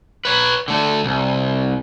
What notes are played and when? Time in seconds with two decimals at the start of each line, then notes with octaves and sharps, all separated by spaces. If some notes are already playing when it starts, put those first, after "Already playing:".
0.25 B4 C#5
0.68 D3 A3
1.04 C2